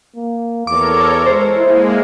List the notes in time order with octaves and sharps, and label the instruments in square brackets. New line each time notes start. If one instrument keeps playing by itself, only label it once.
[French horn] A#3
[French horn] E2 [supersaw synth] A4 A#4 C#5 [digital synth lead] D6
[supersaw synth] G#3 [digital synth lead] C5
[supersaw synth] G#3 A#3 [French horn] E4